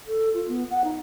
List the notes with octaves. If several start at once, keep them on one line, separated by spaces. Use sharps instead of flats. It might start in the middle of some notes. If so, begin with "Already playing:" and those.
A4
F4
B3
F#5
D#4